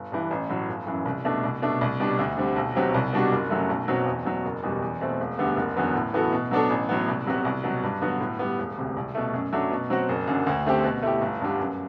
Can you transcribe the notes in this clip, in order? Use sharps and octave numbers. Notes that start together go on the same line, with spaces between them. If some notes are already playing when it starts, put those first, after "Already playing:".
Already playing: G1
G2 E3
A1
A2 F#3
G1
F#2 E3
C2
B2 A3 D4
C2
B2 A3 D4
C2
B2 G3 D4
D2
D3 G3 C4
B1
B2 F#3 C4 G4
C2
B2 G3 D4 F#4
F#1
F#2 F#3 A3
B1
B2 F#3 C4 F#4
E2
B2 F#3
F#1
E2 B2 G3
E2
B2 A3 C4
E1
D2 D3 G3 B3
F#1
E2 D3 F#3 B3
A2
E3 B3 F#4 A4
B2
F#3 B3 D4 A4
A1
A2 F#3 B3
C2
C3 F#3 B3 F#4
C2
B2 F#3
G2
D3 F#3 B3 F#4
A2
G3 B3
E1
D2 C3
C2
B2 A3
F#2
F#3 A3 D4
B2
F#3 C4 F#4
F#1
F#2 D3
D2
D3 A3 C4 G4
B2
A3 E4 G4
G1
G2 D3 G3
F#2